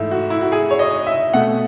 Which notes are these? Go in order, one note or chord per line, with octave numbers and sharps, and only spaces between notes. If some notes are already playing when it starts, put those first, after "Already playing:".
Already playing: G#2 E3 A3 E4
F#4
E4
F#4
G#4
C#5
D#5
E5
B2 A3 F#5